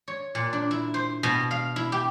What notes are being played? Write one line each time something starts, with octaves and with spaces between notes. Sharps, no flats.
C#5
A#2
D4
E4
C5
B2
F5
E4
G4